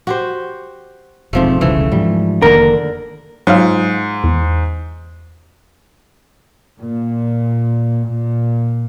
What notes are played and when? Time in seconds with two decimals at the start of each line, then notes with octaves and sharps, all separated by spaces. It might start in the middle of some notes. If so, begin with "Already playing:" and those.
0.07 F#4 G4 C5
1.33 E1 G#2 F3 A3 C4
1.61 E1 C2 C#3 E3 A3
1.92 G#2 F3 G3
2.42 F1 D3 D#3 A#3 D4 A#4
3.47 G#2 F#3 F4
4.24 E2
6.79 A#2
8.07 A#2